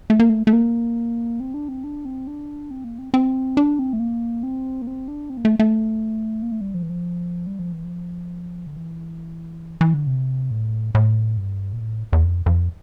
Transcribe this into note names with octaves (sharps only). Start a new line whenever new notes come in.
A3
A#3
A3
A3
A#3
C4
D4
C4
D4
C4
D4
C4
A#3
C4
C4
D4
C4
A3
A#3
C4
A#3
C4
D4
C4
A#3
A3
A3
A#3
A3
G3
F3
E3
F3
G3
F3
E3
F3
D3
E3
E3
D3
C3
A2
A2
G2
A#2
A2
E2
F2
F2